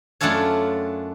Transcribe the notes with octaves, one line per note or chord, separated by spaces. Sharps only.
F#2 A3 D4 F4 A4 C#5